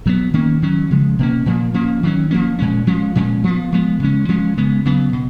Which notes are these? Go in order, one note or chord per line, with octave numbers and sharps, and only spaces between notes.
B2 F#3 B3
D#3 A#3 C#4
D#3 F#3 C#4
C#3 F3 G#3
B2 A#3 C#4
A#2 F3 A#3
F3 A#3 C#4
D#3 F#3 C#4
F3 A#3 C#4
A#2 G#3 C#4
F3 G#3 C#4
A#2 F3 G#3 C#4
F3 B3
F3 G#3 B3
C#3 G#3 C#4
F3 G#3 C#4
C#3 G#3 B3
C#3 F#3 B3
B2